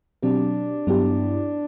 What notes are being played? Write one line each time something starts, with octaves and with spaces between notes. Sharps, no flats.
B2 F#3 C4 D4 G4
G2 F#3 B3 E4 G4